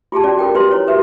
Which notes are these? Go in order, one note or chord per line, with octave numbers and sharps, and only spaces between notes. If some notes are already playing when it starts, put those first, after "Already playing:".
F4 G4 G#4 A5
C#4 F4 F#4 D5
F4 A4 A#4 G5
F4 G4 B4 C6
E4 C#5
F#4 G4 A#4 B4 E5